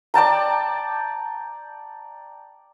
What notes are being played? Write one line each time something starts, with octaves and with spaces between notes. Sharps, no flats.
D5 G5 A5 A#5